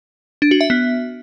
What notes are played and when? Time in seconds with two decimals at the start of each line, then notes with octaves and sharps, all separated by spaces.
0.42 D4
0.51 F#4
0.61 E5
0.70 B3